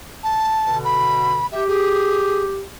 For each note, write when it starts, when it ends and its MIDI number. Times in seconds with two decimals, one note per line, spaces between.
0.23 0.78 81
0.67 1.42 47
0.67 1.42 50
0.84 1.46 83
1.52 1.67 67
1.52 1.66 76
1.67 2.60 67
1.67 2.44 68